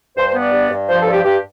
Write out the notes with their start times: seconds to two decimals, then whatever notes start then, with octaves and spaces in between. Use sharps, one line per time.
0.16 G2 C5
0.28 C5
0.34 B3
0.40 D5
0.53 G2
0.71 G2
0.88 F3 C5
1.01 A4
1.06 G2
1.12 G4
1.24 G2 G4